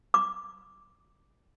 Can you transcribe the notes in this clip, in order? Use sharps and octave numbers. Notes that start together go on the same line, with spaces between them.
D6